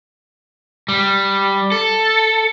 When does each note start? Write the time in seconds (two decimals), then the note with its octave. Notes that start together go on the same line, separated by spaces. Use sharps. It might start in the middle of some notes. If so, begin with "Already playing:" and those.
0.88 G3
1.72 A4